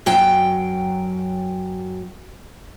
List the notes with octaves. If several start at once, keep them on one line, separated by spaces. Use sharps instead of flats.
F#2 F#3 G5